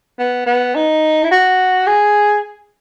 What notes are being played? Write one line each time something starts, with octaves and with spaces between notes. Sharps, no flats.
B3
B3
D#4
E4
F#4
G#4